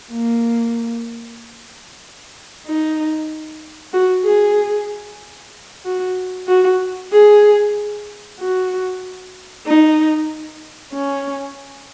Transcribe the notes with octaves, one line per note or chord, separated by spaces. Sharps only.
A#3
D#4
F#4
G#4
F#4
F#4
G#4
F#4
D#4
C#4